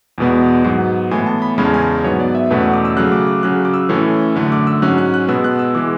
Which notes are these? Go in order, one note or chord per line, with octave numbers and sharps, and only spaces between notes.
E2 B2 G#3 B3
G#2 F#3 B3
A2 E3 B3 G#5
A5
B5
E2 C#3 G#3 C#4 B5
A5
G#5
A5
G#2 F#3 B3 C#5
D5
E5
E2 B2 A3 C#4 B4
F#5
D6
E6
C#3 F#3 A3 F#6
D6
D6
C#3 F#3 C#4 F#6
D6
E6
A2 E3 A3 C#4
F#2 D3 A3
D6
E6
G#2 F#3 C#4 F#6
F#6
F#6
B2 G#3 B3 E6
F#6
E6
E3 G#3 D6